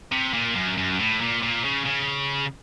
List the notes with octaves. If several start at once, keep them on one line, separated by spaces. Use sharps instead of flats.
C3
A#2
F#2
F#2
A2
A#2
A#2
C#3
C#3